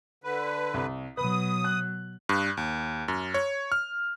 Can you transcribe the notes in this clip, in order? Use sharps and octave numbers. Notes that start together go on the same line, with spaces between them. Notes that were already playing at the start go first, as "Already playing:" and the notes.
D3 B4
C2
B2 F#3 B4 D#6
F#6
G2
D#2
F#2
C#5
F6